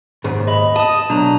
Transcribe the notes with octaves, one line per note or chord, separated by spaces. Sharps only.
D#2 G#2 C#3
D#5 B5
D#5 A5 D#6
B1 D4 A#5